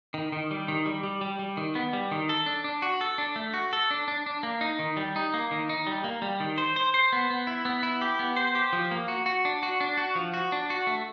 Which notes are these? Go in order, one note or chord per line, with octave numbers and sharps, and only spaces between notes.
D#3
D#3
G3
D#3
G3
G3
G3
G3
D#3
B3
G3
D#3
A4
D4
D4
F#4
A4
D4
A3
F#4
A4
D4
D4
D4
A#3
D#4
D#3
G3
D#4
A#3
D#3
D#4
G3
A#3
G3
D#3
C5
C5
C5
B3
B3
E4
B3
E4
G4
B3
C5
G4
F3
A#3
F#4
F#4
D4
F#4
D4
F#4
F3
F#4
D4
F#4
A3